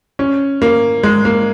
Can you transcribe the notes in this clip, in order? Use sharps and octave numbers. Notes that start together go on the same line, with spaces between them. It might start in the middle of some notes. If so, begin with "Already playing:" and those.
C#4
A#3
G#3
A#3